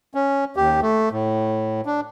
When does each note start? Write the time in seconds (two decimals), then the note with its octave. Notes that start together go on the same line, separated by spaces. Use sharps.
0.15 C#4
0.56 D#2 G4
0.82 A3
1.12 A2
1.86 D4